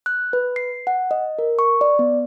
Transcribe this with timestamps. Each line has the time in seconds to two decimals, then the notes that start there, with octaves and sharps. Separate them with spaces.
0.06 F#6
0.33 B4
0.56 C7
0.87 F#5
1.11 D#5
1.39 A#4
1.59 C#6
1.81 D5
1.99 B3